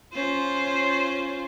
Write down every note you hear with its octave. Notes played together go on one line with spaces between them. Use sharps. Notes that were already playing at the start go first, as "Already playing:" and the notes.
C#4 F4 C5